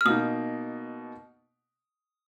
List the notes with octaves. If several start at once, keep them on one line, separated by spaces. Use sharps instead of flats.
F6
B2 A#3 D#4 D#6